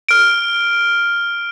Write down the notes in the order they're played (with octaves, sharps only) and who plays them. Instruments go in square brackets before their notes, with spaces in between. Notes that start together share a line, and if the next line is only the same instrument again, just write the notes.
[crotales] F6 D7